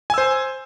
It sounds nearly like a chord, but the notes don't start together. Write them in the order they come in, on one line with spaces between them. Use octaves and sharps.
G#5 E6 C5